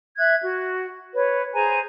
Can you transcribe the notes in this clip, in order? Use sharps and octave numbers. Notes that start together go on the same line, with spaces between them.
E5 F#6 G#6
F#4
B4 C#5
G#4 C5 G#5 A#5